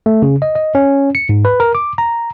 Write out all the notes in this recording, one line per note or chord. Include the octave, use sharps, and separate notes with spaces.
A3
C#3
D#5
D#5
C#4
C#7
G#2
B4
A#4
D6
A#5